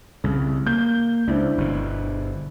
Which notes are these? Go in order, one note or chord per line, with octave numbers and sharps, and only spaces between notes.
C2 C#3
A#3 G6
C#2 D4 E4 C5
G1 B2